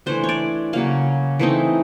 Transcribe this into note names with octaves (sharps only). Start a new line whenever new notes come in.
E3 A3 D4 C5
C#5
D5
C#3 F#3 A#3 F5
E3 A3 C4 D#4